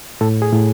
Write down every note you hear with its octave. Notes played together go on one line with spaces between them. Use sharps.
A2 A4
G#4
A2